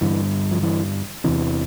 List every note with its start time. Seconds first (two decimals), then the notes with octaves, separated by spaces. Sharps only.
0.01 G2 D3 E3
0.51 F3
0.63 E3
1.24 E2 C3 E3